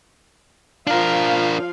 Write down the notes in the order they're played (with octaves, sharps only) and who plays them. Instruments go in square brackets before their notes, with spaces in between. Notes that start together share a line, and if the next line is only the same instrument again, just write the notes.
[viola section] F3 F5 [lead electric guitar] D4 A#4